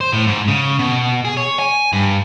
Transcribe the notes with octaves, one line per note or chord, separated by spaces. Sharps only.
C5
A2
G#2
C#3
B2
G#4
C#5
G#5
G2